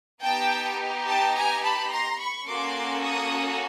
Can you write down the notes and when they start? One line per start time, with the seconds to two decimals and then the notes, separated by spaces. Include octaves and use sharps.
0.22 B3 D#4 G4 G5 A5
1.07 G5 A5
1.35 G#5 A#5
1.62 A5 B5
1.91 A#5 C6
2.19 B5 C#6
2.47 A#3 C#4 F#4 A4 C6 D6
3.03 C#6 D#6